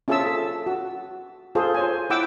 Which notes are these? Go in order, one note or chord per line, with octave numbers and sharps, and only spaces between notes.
C#4 F4 G#4 E5 A5 E6
A4
F#4
F4 G#4 A4 C5
C5 C#5 G#5
E4 F#5 G5 D6 E6